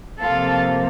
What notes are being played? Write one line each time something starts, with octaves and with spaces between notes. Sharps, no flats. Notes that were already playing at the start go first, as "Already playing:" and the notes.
C3 F3 A#3 F4 A4